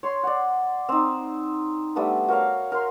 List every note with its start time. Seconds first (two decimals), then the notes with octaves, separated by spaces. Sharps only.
0.03 C#5 C6
0.23 D5 F#5
0.89 C4 D#4
1.96 G3 A3 B3 D4
2.28 F#4 A#4 C#5 F5
2.72 A#4 C6